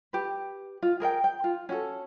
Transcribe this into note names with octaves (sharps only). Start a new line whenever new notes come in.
G4 B4
F4
G#4 A#4 F5 G5
G5
F4
C#4 F#4 A4